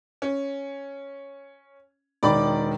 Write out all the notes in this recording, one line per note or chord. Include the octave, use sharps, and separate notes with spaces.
C#4
E1 D#3 D5 B5 D6